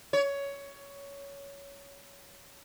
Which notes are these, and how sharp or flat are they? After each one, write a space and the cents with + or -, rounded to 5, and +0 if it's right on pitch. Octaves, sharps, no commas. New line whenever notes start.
C#5 +15